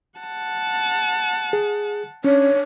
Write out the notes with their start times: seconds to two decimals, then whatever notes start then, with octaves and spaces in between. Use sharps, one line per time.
0.19 F#5 A5
1.53 G#4
2.24 C#4 D4 C#5